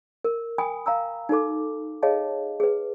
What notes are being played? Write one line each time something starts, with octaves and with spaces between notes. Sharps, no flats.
A#4
G5 G#5 B5 D#6
F5 A#5 E6
D#4 F#4 A4 D6
G#4 C#5 D#5 F5 A5
G#4 B4